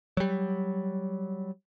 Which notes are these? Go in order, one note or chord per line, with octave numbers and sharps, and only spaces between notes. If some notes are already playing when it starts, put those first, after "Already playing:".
F#3 G3